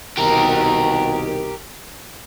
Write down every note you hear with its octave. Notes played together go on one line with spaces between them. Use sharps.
C2 B2 D#3 G4 A#4